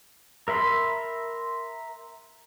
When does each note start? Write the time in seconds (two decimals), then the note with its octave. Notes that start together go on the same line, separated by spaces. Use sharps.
0.48 A#4 E5 B5 C6